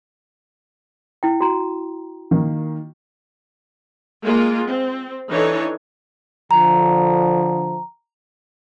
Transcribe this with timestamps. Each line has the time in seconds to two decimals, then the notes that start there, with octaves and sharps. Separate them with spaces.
1.23 E4 G5
1.41 F#4 A#5
2.31 D#3 A#3
4.23 G#3 A#3 F4
4.67 C4
5.30 E3 D4 D#4 A4 C#5
6.51 D3 F3 A#5